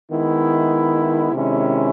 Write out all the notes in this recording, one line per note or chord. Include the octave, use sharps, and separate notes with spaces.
D#3 G#3 B3 E4
C3 D#3 G#3 C#4 E4